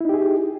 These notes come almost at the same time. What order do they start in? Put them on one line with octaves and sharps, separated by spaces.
E4 D#4 G4 G#4